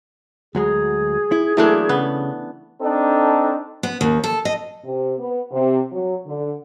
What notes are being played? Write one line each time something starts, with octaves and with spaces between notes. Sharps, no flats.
D2 F#3 G#3 G#4
E4
E3 F#3 A3 A#3 D4 E4
C#3 B3
C4 D4 D#4 A4
B3
D#2
A4
D#5
C3
B3
C3
F#3
D3